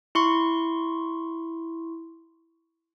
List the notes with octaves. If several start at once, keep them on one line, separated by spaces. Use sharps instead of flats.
E4 C6 C#6